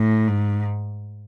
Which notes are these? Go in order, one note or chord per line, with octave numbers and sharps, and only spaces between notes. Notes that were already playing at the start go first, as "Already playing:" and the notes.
Already playing: A2
G#2